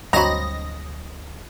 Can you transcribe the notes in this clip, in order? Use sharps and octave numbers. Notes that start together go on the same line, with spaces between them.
D2 G2 F#3 C4 D#5 A#5 B5 A#6